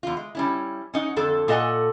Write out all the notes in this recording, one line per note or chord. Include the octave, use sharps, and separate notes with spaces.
E2 F4
G#3
G3 C#4 E4
C#4 D#4 F#5
F2 D3 A4
A#2 A4 D#5 F#5 G#5